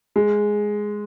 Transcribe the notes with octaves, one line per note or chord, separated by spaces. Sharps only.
G#3